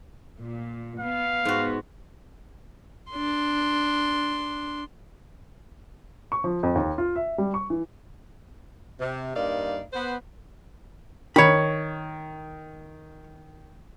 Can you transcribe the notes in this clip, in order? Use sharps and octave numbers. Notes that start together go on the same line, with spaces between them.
A#2
B3 F5
G#2 F#4
D4 C6
C#6
F3
F2
D#2
F4
E5
G3
C#6
E3
C3
G2 A#3 D#4 D5 F5
B3 C5
D#3 C#5 B5